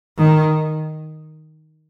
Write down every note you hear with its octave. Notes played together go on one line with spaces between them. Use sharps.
D#3